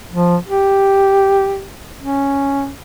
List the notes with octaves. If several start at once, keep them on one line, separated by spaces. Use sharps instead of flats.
F3
G4
C#4